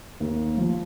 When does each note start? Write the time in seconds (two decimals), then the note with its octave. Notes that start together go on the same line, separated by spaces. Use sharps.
0.20 D#2
0.58 F3